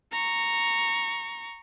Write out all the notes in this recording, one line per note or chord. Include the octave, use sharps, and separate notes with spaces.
A#5 C#6